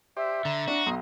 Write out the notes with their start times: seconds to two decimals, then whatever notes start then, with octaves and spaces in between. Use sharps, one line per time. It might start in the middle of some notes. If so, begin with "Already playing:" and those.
0.17 G4 C5 D5 E5
0.45 D3 A#5
0.68 D4 F#4
0.86 B1 D#5 A#5 C6